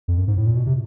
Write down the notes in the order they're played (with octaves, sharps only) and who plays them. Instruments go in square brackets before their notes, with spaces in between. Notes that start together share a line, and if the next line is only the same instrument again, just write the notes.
[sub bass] F2
F#2
G#2
A2
A#2
B2
C3